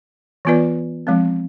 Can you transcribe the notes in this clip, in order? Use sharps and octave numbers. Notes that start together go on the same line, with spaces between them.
E3 B3 F4 B4 D5
F3 G#3 C4